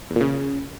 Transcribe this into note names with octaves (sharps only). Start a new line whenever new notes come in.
E2
A#2
C#3